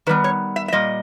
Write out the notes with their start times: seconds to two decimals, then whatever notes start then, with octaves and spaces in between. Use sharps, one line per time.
0.07 D#3 G3 B3 B4
0.24 C#5
0.56 E5
0.68 E5
0.73 A#2 G3 D#5